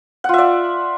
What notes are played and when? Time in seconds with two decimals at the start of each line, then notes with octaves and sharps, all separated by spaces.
0.24 F#5
0.29 F4
0.34 E5
0.38 D5